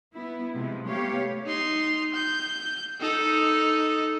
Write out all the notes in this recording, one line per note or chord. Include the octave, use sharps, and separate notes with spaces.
B3 E4
C3 F3 G#3
A3 B3 G4 C#5 F5
D#4 C6
G6
D#4 A4